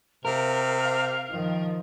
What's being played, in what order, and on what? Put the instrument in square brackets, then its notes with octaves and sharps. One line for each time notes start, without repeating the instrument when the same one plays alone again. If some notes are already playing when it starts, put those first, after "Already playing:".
[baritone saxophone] C3 [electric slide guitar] A#4 [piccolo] F5
[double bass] D#3 F3